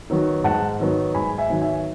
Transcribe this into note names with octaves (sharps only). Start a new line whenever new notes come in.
D#3 F#3 B3
G#2 F#5 A5
D#3 F#3 B3
G#2 G#5 B5
E5 G#5
D#3 F#3 B3
E5 G#5